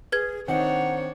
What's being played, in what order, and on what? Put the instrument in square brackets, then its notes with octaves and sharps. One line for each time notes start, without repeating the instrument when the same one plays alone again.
[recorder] G#4 [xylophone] B4 G#6
[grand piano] D#3 C4 D#4 [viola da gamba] D4 C#5 [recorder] F#5